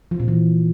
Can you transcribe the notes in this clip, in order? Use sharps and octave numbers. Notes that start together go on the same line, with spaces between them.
F3
A#2
E3